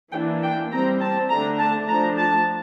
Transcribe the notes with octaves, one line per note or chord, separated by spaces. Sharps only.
E3 A#3 D4 G5
G5
G3 C4 A#5
A5
D3 A3 D4 A#5
A5
F3 A3 D4 A#5
A5